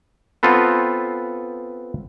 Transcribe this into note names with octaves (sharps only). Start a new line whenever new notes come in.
B3 C4 F4 A4 B4